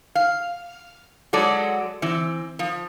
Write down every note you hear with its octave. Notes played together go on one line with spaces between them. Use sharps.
F5
F#3 G#3 A4 D5
E3 C4
F3